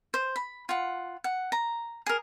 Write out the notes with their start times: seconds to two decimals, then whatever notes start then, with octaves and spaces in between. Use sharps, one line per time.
0.14 C5
0.36 B5
0.69 F4 F#5
1.24 F#5
1.52 A#5
2.06 G#4 A#4